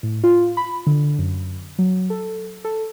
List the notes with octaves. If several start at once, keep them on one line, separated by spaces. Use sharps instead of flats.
A2
F4
B5
D3
F#2
F#3
A4
A4